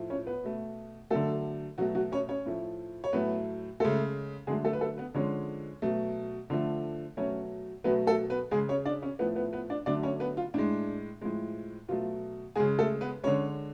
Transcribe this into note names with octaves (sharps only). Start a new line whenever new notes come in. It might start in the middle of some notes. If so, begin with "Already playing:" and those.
Already playing: A2 F3 A3
C#4 C#5
B3 B4
B2 A3
D3 F#3 A3 A4
B2 F#3 A3 F#4
F#3 F#4
C#4 C#5
C#4 C#5
A2 F3 A3
C#5
A2 F#3 A3 B3 B4
C#3 G#3 A3 A4
D3 F#3 G#3 A3 G#4
A3 A4
B4
A3 A4
B3 B4
D3 F3 G#3 C#4 C#5
B2 F#3 A3
D3 F3 A3
B2 F#3 A3 C#4 C#5
B2 F#3 A3 B3 B4
A3 A4
B3 B4
C#3 G#3 G#4
C#4 C#5
D4 D5
C#4 C#5
A2 F3 A3 B3 B4
B3 B4
B3 B4
D4 D5
D3 F#3 A3 D4 D5
C#4 C#5
B3 B4
F4
A2 G#3 D4
A2 F3 G#3
B2 F#3 A3 F4
C#3 G#3 G#4
A3 A4
B3 B4
D3 G#3 C#4 C#5